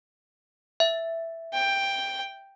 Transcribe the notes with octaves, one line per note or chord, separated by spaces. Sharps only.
E5
G5